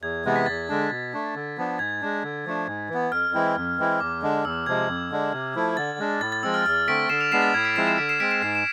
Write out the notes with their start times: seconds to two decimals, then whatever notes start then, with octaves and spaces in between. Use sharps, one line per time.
0.02 E2 G#6
0.25 C3 E3 G#3 B3
0.36 B6
0.46 E2 A6
0.68 D3 G#3 D4
0.91 B2
1.13 A3 D4
1.35 D3
1.58 F3 B3 D4
1.79 G#2 G#6
2.01 G#3 D4
2.23 D3
2.46 F3 A3 D4
2.67 G#2
2.89 E3 B3
3.12 F2 F6
3.34 E3 G#3 C4 E4
3.57 F2
3.78 E3 G#3 C4 E4
4.00 E2 D6
4.22 D3 G#3 D4
4.44 E2 E6
4.66 C3 F3 G#3 G#6
4.88 F2
5.11 D3 G#3 D4
5.32 C3
5.55 F3 A3 E4
5.77 D3 A6
5.99 G#3 D4
6.21 A2 A6
6.32 A6
6.43 F3 G#3 C4 E6
6.54 F6
6.66 E2 F6
6.87 D3 A3 C4 B6 D7
7.09 D3 C7 E7
7.20 D7 F7
7.32 G#3 B3 D4 C7 E7
7.42 A6
7.54 A2 G#6
7.65 B6 D7
7.76 F3 G#3 C4 E4 C7 E7
7.87 C7 E7
7.98 D3 B6 D7
8.09 C7 E7
8.20 G#3 C4 B6 D7
8.31 C7 E7
8.42 G#2 C7 E7
8.55 E7